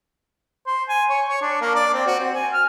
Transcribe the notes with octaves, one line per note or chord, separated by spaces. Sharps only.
C5
G#5
C#5
C#5
D4
A#3
D5
C4
F#4
C4
G#5
F6